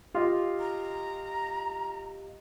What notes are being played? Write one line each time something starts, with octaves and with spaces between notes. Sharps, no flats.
F4 G4 D#5 F5
A#5